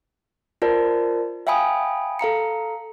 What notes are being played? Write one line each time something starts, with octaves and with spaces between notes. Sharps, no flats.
F4 A#4 C5 D5 A5
E5 F5 G5 G#5 B5 D#6
A4 F5 A#5 C#7